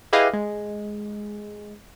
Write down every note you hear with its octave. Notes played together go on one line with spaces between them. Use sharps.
E4 G4 G#4 B4 D#5 F5
G#3